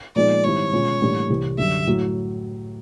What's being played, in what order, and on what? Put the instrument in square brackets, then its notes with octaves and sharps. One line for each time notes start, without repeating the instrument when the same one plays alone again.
[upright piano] A#2 F3 G#3 B3 D#4 [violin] D5
[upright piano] G#2 D#3 G3 C4 E4 [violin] C#5
[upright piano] B2 G#3 C#4 F4
A2 E3 G3 A#3 D4
C2 C3 E3 G3
[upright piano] F#2 D3 G3 [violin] E5
[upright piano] A2 F#3